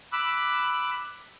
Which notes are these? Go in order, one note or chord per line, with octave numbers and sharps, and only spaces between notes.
B5 D6 E6 F#6